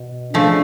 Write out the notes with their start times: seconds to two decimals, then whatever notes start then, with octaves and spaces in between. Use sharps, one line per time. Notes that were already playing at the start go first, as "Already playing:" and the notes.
Already playing: B2
0.33 C#3 F3 A3 D4